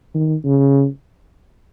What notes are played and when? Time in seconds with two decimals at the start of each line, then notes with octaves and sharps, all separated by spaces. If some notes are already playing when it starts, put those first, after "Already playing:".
0.15 D#3
0.45 C#3